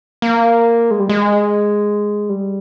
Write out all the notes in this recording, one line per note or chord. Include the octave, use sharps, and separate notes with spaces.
A#3
G#3
G3
G#3
G3